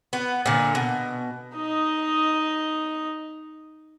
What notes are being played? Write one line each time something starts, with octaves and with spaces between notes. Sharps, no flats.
B3
A#2 D3
B2
D#4 D#5